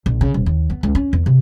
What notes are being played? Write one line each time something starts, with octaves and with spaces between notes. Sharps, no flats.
A#1
C#3
D#1
D#2
B3
C#2
C#4
E2
C3